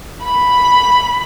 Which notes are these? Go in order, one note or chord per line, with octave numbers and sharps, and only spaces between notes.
B5